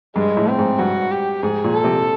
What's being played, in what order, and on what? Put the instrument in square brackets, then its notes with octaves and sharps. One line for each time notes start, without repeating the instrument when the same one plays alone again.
[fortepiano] G2 [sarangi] G#3
[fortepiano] A2
[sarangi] C4
[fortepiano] G#2
[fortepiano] G2 [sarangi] F#4
[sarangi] G4
[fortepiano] G#2 [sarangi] G#4
[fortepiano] A#2
[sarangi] A4
[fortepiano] C3